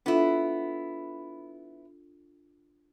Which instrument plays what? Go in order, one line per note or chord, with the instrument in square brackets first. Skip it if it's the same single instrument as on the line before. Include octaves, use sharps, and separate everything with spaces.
[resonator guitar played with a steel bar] B3 E4 [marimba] D4 F4 A4